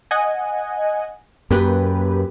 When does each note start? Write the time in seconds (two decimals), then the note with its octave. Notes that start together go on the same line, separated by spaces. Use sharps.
0.11 D#5 F#5 G#5
1.51 F#2 A#3 G4 B4